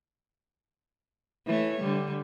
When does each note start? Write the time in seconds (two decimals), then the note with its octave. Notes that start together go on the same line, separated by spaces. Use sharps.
1.46 E3 A3 C#5
1.81 D3 G3